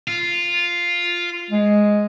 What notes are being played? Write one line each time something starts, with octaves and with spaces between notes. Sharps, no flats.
F4
G#3